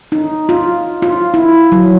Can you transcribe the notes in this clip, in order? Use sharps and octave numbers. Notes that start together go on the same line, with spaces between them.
D#4
F4
F4
E4
F#3